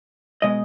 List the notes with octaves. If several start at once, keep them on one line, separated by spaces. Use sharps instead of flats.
B2 G#3 D#5